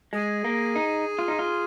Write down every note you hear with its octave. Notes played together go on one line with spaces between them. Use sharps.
G#3 G#4
A#3
D#4
F4
D#4
F4